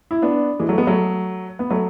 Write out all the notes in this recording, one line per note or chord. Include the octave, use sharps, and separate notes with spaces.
E4
B3 D4
E3 G#3
F#3 A3
G#3 B3
F#3 A3
B3
F#3 A3